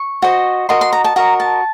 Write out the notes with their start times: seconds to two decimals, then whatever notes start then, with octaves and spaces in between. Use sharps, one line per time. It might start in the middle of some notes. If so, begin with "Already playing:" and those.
Already playing: C#6
0.22 F#4 C5 D#5
0.69 F#4 A#4 D#5 C6
0.81 C6
0.93 A#5
1.04 A5
1.16 F#4 A#4 D#5 A#5
1.40 A5